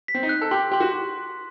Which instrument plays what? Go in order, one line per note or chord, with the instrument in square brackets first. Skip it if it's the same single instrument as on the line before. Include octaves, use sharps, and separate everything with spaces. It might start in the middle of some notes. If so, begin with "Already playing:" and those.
[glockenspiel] B6
[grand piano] C4
D#4
[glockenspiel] F#6
[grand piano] A4
[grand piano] G4 [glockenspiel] C6
[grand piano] G4 [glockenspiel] C6
[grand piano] F#4